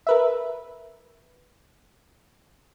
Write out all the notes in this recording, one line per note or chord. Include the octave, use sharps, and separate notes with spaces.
A#4 B4 E5